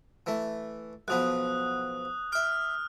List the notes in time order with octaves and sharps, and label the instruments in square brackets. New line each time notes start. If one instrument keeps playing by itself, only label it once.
[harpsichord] E3 A3
[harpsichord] B1 F3 B3 [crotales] D#6 F#6
[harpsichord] E5 D6 [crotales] F6